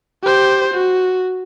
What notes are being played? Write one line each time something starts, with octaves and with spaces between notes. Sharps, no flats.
G4 C5
F#4